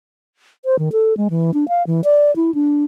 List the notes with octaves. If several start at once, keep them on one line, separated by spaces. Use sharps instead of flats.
C5
D#3
A4
G#3
E3
D4
F5
E3
D5
E4
D4